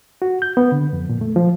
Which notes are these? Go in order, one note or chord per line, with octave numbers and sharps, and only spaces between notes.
F#4
G6
B3
D3
F2
A#2
A3
F3